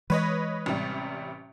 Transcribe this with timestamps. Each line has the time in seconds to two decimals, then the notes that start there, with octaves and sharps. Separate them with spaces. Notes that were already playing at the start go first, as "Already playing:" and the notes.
0.10 E3 G#3 B4 C#5 D#5
0.66 A1 C3 G3